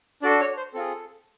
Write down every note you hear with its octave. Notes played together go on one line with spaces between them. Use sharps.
D4 F#4 A4 D5
C#5
C5
C4 F4 G#4 A4